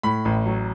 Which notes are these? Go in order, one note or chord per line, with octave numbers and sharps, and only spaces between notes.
A2 B5
A1
F#3